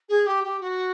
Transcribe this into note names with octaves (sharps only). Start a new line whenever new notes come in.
G#4
G4
G4
F#4